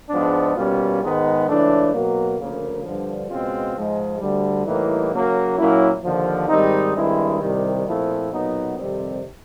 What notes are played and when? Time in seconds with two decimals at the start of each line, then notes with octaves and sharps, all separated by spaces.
0.10 G#2 F3 G#3 B3 D4
0.55 B2 G3 A#3 C#4 F4
1.01 G#2 D#3 G#3 B3 D#4
1.47 C#2 C#3 E3 A3 D4
1.93 B2 F#3 A#3
2.38 D2 C#3 F3 A#3
2.84 G2 D3 F3
3.29 C#2 B2 G#3 C4 F4
3.75 G#2 F3 G#3
4.20 D2 D3 G3
4.66 A2 E3 G3 A#3 D#4
5.11 C#3 F#3 A#3
5.57 A#2 F#3 A#3 C#4 E4
6.03 D#2 D3 F3
6.48 G#2 D#3 G3 C4 D#4
6.94 G2 D#3 G#3 C4 E4
7.40 C2 C3 D#3 G3
7.85 A#2 F3 A3 C4 E4
8.31 B1 A#2 F#3 B3 D#4
8.77 F2 C3 D#3 G3 C4